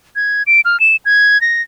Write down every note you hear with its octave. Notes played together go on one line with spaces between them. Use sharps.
G#6
D7
F6
E7
G#6
A#6